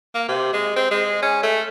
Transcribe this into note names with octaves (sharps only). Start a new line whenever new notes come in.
A#3
C3
G#3
C4
G#3
C#4
A3